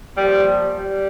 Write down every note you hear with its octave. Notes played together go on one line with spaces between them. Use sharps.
A#2 F3 G3
G3